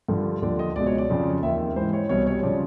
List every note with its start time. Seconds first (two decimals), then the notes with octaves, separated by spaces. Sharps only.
0.08 G2 D3 F3
0.42 D#2 D3 F3 D5
0.59 D#5
0.76 C#2 D5
0.79 B2
0.86 C#5
0.98 D5
1.10 F2 C#3 F3
1.43 D#2 D#3 E5
1.76 G#2 E3 C5
1.93 C#5
2.09 C2 B2 C#5
2.27 C#5
2.43 C#3 F3 D5